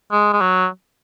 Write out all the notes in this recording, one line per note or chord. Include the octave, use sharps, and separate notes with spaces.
G#3
G#3
F#3